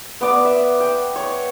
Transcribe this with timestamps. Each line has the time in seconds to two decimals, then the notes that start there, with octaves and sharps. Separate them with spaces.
0.21 B3 D5 D6
0.45 E5
0.80 G5
1.16 C#5